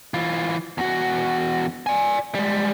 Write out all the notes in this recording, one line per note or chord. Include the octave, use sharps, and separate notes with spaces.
E3 F4
E2 F#4
D5 G#5
G3 G#3